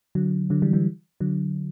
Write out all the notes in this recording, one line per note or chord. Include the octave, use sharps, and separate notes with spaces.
D3 F#3
D3 F#3
E3 G3
E3 G3
D3 F#3